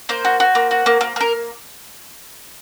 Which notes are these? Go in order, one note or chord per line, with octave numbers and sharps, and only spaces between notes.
A#3 C5
F#4
F#4
A#3
F#4
A#3
A#3
A#3 A#4